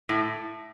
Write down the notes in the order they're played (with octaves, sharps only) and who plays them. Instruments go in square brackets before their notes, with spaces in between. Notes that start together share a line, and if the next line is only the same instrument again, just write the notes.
[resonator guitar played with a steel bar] A2